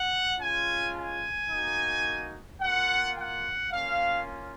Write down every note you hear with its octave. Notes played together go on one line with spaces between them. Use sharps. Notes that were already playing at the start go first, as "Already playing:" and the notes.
Already playing: F#5
G#3 C#4 F4 G#5
G#5
A#3 D#4 F#4
A#3 F4 F#5
F#5
A#3 C#4 F4 F5